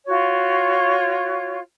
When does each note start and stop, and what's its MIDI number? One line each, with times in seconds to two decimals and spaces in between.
0.06 1.58 65
0.06 1.58 66
0.06 1.58 73